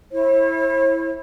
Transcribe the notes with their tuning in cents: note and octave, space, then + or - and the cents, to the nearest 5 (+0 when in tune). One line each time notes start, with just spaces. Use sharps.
E4 +0 C#5 -45